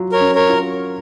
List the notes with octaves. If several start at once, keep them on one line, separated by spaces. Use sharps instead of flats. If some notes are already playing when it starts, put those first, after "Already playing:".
Already playing: F#3 F4
A#4 C#5
C#4
A#4 C#5
F4